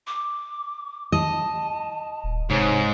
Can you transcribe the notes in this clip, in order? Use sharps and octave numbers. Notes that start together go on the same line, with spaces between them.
D6
D#5 A5
D#1
G#2 C3 C#5